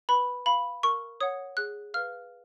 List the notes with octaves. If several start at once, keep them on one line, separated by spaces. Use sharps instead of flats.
B4 B5
F5 B5
A#4 C#6
C#5 F#5 D#6
G#4 F#6
B4 F5 F6